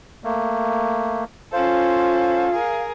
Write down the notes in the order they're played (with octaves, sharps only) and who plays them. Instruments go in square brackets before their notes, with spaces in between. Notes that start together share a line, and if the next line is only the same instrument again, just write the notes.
[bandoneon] A3 A#3
[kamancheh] C#4 A4 [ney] F4 [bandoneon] C5 [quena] F5
[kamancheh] G#4 A#4